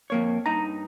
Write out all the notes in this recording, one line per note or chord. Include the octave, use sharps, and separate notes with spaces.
F2 A#3 C#5
G2 D#4 A#5